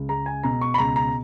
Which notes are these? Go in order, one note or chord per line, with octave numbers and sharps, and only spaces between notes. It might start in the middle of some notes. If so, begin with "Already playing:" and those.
Already playing: C#2
G#3 A#5
G#5
B2 A#5
C#6
B5
C#2 A#5
A#5